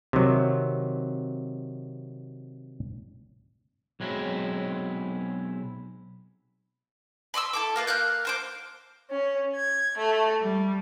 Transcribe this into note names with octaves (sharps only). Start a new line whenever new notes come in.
C3 D#3 F#3
B1 F#3 G#3 C4 E4
B5 C6 D6 E6
E4 A4 D6
A#3 F4 B4
A#3 F5 F#6 G6
A#3 C5 D6
C#4
G#6
A3
G3